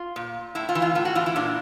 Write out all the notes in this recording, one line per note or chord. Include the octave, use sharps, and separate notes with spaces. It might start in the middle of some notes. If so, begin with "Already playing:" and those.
Already playing: F4
A#2
A2 E4
F4
E3
F4
A2 F4
F#4
E3 F4
E4
A#2 D4